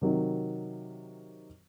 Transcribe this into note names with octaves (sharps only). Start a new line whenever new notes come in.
C3 D#3 F#3